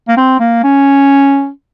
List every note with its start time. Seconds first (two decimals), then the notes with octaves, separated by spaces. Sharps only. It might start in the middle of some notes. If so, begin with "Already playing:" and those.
0.08 A#3
0.17 C4
0.40 A#3
0.64 C#4